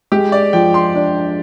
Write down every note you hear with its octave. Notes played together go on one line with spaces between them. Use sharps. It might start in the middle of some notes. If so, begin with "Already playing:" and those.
G#3 G4
D5
F3 G5
C6
D4